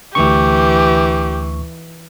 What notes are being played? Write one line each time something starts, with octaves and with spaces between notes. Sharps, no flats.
D2 E3 G4 C#6